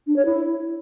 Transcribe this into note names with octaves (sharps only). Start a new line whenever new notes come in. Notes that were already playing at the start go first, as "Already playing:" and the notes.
D4
C#5
E4